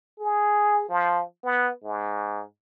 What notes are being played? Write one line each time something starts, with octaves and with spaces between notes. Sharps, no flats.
G#4
F3
B3
G#2